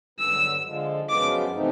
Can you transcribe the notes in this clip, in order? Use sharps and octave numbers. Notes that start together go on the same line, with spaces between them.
G2 D3 F#3 B3 E6
D3 F3 G#3
F#2 C#3 F3 G#3 B3 D6
C3 E3 A3 C4 D#4